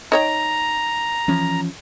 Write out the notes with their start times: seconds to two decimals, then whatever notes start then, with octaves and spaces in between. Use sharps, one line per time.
0.12 D#4 C#5 G5 A#5
1.28 E3 F3 C#4